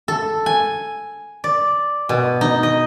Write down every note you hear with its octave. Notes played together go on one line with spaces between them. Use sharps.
A4
G#5
D5
B2
D#4
D#5